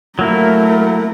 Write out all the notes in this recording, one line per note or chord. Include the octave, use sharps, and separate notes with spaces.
F#3 A3 A#3 E4 A#4